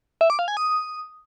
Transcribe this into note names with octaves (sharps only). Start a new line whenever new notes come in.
E5
D6
F5
G#5
D#6